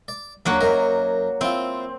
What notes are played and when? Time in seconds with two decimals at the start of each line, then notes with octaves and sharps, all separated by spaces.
0.08 D5
0.46 D#2 D3 F#3 A#3 F#4
0.61 F#2 A#4 D#5
1.41 C4 E4 F4